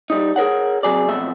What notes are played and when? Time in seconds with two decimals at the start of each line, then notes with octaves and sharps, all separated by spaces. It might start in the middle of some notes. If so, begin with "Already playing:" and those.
0.10 G3 D#4
0.36 G#4 A#4 C#5 F#5
0.83 C3 F#3 G#4 D5
1.09 F2 B2 A3 E5